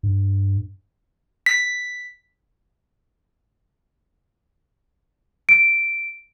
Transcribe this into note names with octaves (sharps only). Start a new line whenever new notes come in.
G2
B6
D7